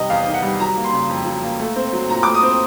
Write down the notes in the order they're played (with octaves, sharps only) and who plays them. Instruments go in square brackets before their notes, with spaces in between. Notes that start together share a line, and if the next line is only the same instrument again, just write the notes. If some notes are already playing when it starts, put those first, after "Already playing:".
Already playing: [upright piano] C3 D#3 G3 D#5
E2 F5
D#3
F#5
G3
F#3 A#5
A#3
C6
C#3
F2
F#3
A#3
A3
C4
F#3
A#2 A#5
A3 D6
D#6
C4